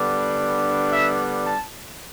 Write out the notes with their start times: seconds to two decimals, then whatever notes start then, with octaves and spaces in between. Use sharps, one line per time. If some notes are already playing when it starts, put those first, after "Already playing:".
Already playing: D3 G3 B3 D4
0.91 E5
1.44 A5